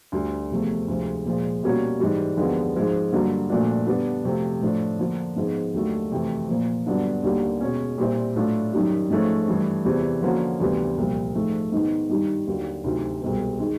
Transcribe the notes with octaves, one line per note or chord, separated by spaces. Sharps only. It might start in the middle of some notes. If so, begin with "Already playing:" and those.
D2 D3 G3
E2 C3 F3 A3
D2 C3 F3 G#3
A#2 F3 G#3
B2 G3 A#3 C#4 F#4
G#2 E3 G3
D#2 D3 F3 G#3 B3
G#2 F3 G#3 C4
G2 D3 F#3 A#3
A#2 F3 A3 D4 F#4
D3 G3 B3 D4
F2 C3 F3 A3
A2 F3 A3 D4
D3 F3 A#3 D4
G#2 F3 G#3 B3
D#2 D3 F#3 A3
F2 C3 E3 A3
A#2 F3 A#3
G2 D3 F#3 B3 D4
D#2 D3 G3 A#3
B2 G#3 C#4
A#2 G3 C4 E4
A2 F#3 A3 D4 F4
F#2 D#3 G3
G#2 F3 A3 C#4
G2 E3 A3
E2 C3 E3 G3 C4
D3 F3 A#3 C#4 F#4
D2 C3 E3 G3 B3
C2 A#2 F3
G#2 F3 A3
G#2 D#3 G#3 B3
G2 D#3 G3
D#2 D3 F#3
D2 C3 D#3 F#3
C2 B2 G#3 C4
D#3 G#3